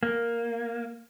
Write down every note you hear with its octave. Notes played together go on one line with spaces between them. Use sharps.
A#3